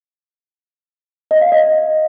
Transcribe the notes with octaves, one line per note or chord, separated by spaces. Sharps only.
D#5
F5
D#5